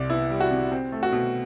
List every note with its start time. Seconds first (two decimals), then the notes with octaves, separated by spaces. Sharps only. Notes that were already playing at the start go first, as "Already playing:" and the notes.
Already playing: C2 C3 D5
0.10 B3 E4
0.30 G3
0.40 F#4
0.51 C3
0.72 C4
0.92 A3
1.03 F#4
1.12 B2